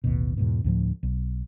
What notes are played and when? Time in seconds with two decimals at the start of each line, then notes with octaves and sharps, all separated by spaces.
0.04 A1 D#2 B2
0.37 E2 G#2 B2
0.64 D2 A2 F3
1.03 B1